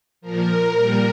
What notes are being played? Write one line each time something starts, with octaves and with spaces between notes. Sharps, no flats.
A#2 F3 A#4
A#2 G3 A#4